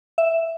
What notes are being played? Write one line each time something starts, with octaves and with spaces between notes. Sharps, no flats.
E5